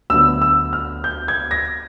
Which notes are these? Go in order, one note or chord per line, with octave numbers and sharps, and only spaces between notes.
D2 D3 F#3 B3 E6
E6
F6
G6
G#6
A#6